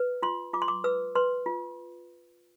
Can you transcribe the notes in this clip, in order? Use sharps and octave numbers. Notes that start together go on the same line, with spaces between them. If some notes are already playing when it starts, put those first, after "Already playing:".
Already playing: B4
F4 C6
F4 D6
C6
D6
B4 E6
B4 C6
F4